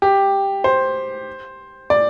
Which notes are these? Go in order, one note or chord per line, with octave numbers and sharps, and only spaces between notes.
G4
C5
D5